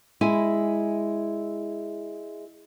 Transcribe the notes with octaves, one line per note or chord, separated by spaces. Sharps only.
G#3 E4 G#5